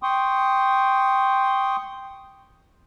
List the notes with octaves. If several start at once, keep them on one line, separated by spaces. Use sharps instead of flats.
G5 C6 C#6 D#6